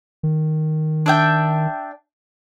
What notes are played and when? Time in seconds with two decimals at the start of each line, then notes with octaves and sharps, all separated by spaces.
0.23 D#3
1.06 D4 E5 G5